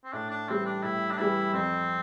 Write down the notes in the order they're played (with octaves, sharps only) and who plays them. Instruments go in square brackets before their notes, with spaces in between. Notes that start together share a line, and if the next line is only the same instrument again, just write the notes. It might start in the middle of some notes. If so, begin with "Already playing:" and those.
[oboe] C4
[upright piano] A2 [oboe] D4
[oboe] D4
[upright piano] E3 G3 [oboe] C4
[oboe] D4
[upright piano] A2 [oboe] E4
[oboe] D4
[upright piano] E3 G3 [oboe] E4
[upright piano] F2 [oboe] C4